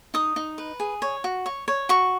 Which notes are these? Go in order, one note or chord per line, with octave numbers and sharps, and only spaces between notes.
D#4 D#6
D#4
B4
G#4
C#5
F#4
C#5
C#5
F#4 C#6